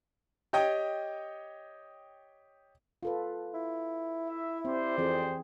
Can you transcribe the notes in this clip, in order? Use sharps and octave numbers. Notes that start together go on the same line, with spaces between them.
G4 C#5 D#5 G5 D#6
F4 A4 B4
E4
E5
C4 G4 C5 D5
F2 E3 C4 G#4